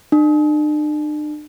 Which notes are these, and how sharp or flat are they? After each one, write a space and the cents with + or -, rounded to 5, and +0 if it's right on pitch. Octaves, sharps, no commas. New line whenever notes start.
D4 +45